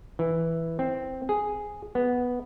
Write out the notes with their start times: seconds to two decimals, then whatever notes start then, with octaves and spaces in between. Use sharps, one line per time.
0.19 E3
0.79 C4
1.29 G#4
1.95 B3